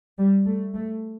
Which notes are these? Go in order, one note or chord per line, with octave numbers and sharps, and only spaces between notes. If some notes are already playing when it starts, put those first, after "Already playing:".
G3
A3
A3